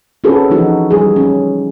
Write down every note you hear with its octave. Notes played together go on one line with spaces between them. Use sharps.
C4 C#4 F#4 G#4 A4 B4
E3 F3 D#4 F#4
G3 G#4
C#4